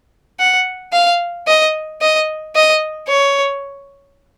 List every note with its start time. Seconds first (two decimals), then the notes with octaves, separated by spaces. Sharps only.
0.40 F#5
0.93 F5
1.48 D#5
2.01 D#5
2.56 D#5
3.09 C#5